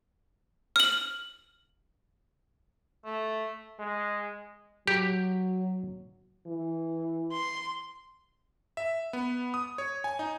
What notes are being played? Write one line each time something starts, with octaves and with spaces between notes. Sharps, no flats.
F6 F#7
A3
G#3
F#3 G4
E3
C6
E5
B3
D#6
C#5
G#5
D#4